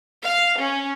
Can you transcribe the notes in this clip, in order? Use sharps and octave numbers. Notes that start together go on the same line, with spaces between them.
F5
C#4